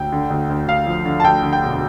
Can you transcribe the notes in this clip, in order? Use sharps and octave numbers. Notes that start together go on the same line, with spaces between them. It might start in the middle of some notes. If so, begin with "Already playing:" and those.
Already playing: D2 G5
D3
D2
D2
D2 F5
F3
D3
A5
D2 G5
D3
G5
E1